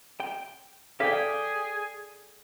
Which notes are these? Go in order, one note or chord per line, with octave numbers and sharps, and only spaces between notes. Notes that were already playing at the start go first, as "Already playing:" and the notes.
G5
G#4 A4 D5 F5 G5 B6